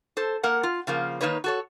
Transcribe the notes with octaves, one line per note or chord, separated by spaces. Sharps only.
A4 C5
A#3 A#4 F#5
F4
C#3 F3 A#3
D#3 E3 A#3 D#4 B4 C#5
F#4 A4 C#5